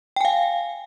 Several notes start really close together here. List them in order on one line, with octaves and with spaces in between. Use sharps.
G5 G#5 F5